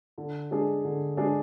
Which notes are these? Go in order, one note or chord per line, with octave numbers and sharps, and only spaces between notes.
D3
G#3 D4 G#4
D3
G#3 D4 G#4